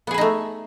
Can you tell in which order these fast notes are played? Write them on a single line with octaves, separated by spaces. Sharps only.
B3 G#4 B4 D#4 A3